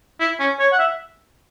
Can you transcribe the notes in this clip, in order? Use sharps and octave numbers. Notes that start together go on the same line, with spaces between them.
E4
C#4
C#5
F#5
E5